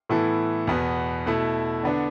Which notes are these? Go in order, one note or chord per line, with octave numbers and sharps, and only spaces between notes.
A2 E3 B3 E4 A4
E2 B2 B3
B2 A3 E4
D3 B3 D4